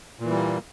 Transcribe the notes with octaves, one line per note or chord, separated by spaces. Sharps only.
A#2 E3 G3 A#3